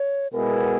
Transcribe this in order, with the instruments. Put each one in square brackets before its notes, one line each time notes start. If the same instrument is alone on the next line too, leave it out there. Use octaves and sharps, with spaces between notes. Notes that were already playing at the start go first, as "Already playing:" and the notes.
Already playing: [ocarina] C#5
[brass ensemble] B2 G#3 B3 E4 G#4 [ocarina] A#4